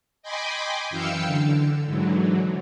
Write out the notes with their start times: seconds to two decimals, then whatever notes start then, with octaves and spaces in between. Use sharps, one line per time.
0.23 D#5 G5 G#5 B5 C6 D6
0.90 F#2 E3 F5 G5 E6 C#7
1.26 D3
1.86 G#2 D3 E3 F#3